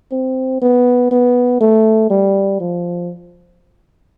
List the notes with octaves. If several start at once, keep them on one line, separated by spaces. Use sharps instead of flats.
C4
B3
B3
A3
G3
F3